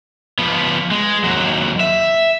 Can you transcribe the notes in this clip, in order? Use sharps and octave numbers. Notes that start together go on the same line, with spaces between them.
F3 B3
G#3
D#2 F#3
E5